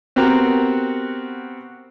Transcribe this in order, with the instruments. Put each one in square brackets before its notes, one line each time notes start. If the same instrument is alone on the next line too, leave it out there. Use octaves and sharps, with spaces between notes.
[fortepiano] B3 C4 F#4 G4 A#4 A#5